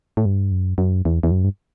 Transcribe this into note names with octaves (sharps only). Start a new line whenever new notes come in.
A2
G2
F#2
F#2
E2
E2
F#2
G2